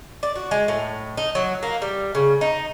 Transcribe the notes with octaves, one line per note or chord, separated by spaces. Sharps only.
D5
F#4
G#3
A2
D#4
F#3
A#3
G3
C#3
D#4